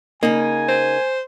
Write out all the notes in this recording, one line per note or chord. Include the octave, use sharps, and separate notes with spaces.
C#3 A#3 D#4 G#5
C5